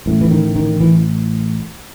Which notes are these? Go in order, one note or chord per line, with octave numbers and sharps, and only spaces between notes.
A1 A2
E3
D#3
D#3
E3